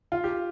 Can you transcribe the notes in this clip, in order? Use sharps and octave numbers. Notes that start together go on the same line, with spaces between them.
F4
G4